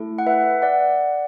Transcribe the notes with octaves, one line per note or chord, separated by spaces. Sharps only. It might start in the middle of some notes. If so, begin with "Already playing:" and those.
Already playing: A3 E4 A4
F#5
B4 E5
D5 F#5